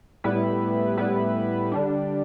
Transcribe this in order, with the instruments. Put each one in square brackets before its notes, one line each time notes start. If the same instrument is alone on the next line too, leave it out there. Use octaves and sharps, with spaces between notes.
[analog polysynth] A2 G3 B3 E4 B4
A2 G3 B3 E4 B4
D3 G3 D4